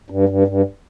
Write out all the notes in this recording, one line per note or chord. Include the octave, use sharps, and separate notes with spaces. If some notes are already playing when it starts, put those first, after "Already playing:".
G2
G2
G2